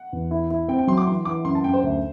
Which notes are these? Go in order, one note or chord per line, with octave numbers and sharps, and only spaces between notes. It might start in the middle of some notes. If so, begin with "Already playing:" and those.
Already playing: F#5
E2
E4
E4
C4 G5
G5
F#3 C6
D6
E3 C6
E3 D6
F#2 C6
A5
F#2 G5
C5
D2